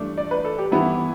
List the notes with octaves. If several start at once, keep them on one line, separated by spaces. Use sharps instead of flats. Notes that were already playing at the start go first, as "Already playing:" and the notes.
Already playing: G2 E3 A3 D4
D5
B4
A4
G4
G2 E3 B3 E4